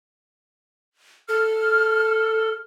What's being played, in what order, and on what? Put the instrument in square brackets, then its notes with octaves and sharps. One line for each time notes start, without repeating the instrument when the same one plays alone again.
[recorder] A4 [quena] F6